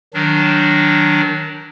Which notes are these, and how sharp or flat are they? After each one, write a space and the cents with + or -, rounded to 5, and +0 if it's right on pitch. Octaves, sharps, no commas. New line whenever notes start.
D#3 +0 F#3 +0 D4 +0